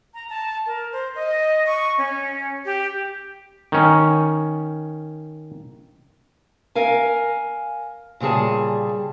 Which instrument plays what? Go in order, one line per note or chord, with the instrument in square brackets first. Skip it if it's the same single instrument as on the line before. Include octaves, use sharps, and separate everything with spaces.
[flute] A#5
A5
A#4
C5
D#5
C#6
C#4
G4
[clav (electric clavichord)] D#3 C#4
[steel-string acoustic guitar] A#4 F5 G#5
A#2 C#3 G3 G#4 A5